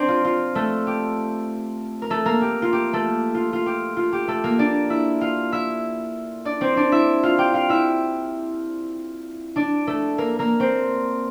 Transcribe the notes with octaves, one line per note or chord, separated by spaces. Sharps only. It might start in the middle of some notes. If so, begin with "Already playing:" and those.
Already playing: C4 D4 C5 D5
F4
F4
A3 A4
G4
A#4
A3 A4
A#3 A#4
G4
F4
G4
A3 A4
F4
F4
G4
F4
G4
A3 A4
A#3 A#4
D4 D5
E4 E5
F4 F5
E4 E5
D4 D5
C4 C5
D4 D5
E4 E5
F4 F5
G4 G5
F4 F5
E4 E5
D4 D5
A3 A4
A#3 A#4
A#3 A#4
C4 C5